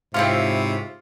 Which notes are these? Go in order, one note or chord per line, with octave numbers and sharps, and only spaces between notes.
G#2 C3 C4 E4 F4 C#5